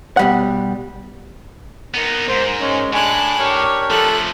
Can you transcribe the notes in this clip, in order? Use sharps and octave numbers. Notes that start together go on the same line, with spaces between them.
B2 G3 F#5
B3 D#4 A#4
G#2 C5
G#3 C#4
A2 D4 G#5 F#6
D4 G4 A#4 C#5
F3 A3 A4 F#6